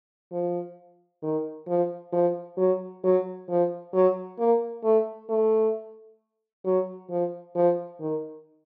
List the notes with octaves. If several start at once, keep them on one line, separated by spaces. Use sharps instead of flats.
F3
D#3
F3
F3
F#3
F#3
F3
F#3
A#3
A3
A3
F#3
F3
F3
D#3